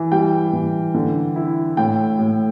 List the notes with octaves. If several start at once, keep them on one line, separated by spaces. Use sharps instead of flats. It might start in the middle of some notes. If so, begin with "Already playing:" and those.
Already playing: E3
G3 G5
E3
D3
E4
A2 G5
A2